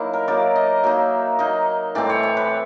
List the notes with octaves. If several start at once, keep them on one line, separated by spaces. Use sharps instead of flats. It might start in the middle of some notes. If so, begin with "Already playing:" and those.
Already playing: F#3 A#3 D#4 E4
A#4
F#3 A#3 D#4 D5
D#5
F#3 A#3 D#4 E5
F#3 A#3 D#4 D#5
A2 E3 G3 C4 D5
C#5
C#5
B4